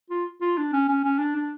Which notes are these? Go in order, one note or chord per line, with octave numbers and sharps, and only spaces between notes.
F4
F4
D4
C#4
C#4
C#4
D4
D4